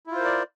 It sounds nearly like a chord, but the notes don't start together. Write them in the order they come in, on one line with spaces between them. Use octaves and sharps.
E4 F4 C5 A#4 D5